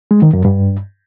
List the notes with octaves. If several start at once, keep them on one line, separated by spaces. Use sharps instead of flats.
G#3
D#3
F#2
G2